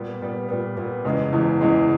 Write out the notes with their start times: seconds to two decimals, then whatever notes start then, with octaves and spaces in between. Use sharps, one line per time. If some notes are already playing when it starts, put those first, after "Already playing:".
Already playing: A#2 G3 B3
0.21 A#2 G3 B3
0.49 A#2 G3 B3
0.76 A#2 G3 B3
1.05 F#1 E2 C#3 E3 G#3
1.32 F#1 E2 C#3 E3 G#3
1.61 F#1 E2 C#3 E3 G#3